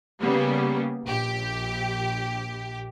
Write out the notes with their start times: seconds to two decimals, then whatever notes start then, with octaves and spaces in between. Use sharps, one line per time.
0.21 C#3 G3 A#3 B3
1.04 A#1 G4